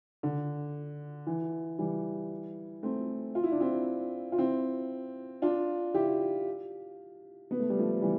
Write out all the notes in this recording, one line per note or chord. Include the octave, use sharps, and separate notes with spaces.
D3
E3
E3 G3
A3 C4
F4
E4
D4
C4 E4
F4
C4 E4
D4 F4
E4 G4
B3
A3
G3
F3 A3
E3 G3